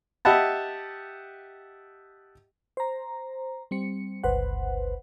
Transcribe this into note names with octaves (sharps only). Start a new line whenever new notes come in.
G4 D#5 E5 F#5 A5
C5 A#5
G3 C4 C#7
G1 C#2 B4 C5 F#5